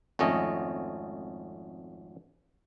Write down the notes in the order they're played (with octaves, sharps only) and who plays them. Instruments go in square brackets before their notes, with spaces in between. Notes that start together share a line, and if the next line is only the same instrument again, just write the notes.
[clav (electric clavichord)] G#1 F2 A3 C#4 D#5